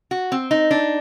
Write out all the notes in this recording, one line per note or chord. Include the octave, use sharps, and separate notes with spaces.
F#4
C4
D#4
D4